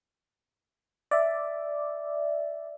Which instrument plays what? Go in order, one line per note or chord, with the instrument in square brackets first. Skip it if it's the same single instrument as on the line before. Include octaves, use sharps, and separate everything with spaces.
[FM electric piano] D5 E5